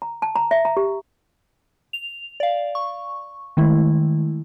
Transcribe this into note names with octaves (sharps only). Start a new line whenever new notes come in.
A#5
A5
A#5
E5
A#5
G4
F7
D5 F5
C#6
D#3 G#3 A3 E4